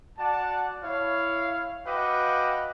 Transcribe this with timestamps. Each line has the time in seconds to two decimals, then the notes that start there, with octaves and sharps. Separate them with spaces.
0.18 F#4 D5 F#5 A5
0.82 E4 C#5 F5
1.85 F#4 B4 D#5 F5 G5 D6